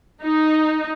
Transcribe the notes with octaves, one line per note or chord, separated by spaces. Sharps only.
D#4